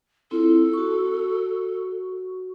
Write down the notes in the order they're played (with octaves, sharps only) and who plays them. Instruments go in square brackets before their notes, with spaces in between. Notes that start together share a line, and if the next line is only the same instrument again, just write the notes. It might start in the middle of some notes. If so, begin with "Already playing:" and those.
[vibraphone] C4 E4 F4 [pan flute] A4
[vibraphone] F#4 C#6